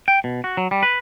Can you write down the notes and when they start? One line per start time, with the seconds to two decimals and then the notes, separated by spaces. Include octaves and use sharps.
0.08 G5
0.24 B2
0.44 F#4
0.57 F#3
0.71 G3
0.83 B4